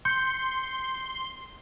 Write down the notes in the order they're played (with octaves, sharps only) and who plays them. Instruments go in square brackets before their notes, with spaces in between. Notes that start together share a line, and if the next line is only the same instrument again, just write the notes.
[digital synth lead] C6 [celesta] G6 C#7